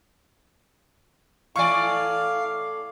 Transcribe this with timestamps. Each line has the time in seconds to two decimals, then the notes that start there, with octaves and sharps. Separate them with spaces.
1.56 A2 E3 D5 F5 G#5 C#6